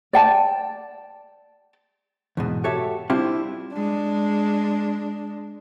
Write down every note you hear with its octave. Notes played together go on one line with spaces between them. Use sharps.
D5 G5 A5
E2 G#2 B2
F#4 G4 A4 C#5 E5
G3 C4 D4 E4 F4 G4
G#3 D4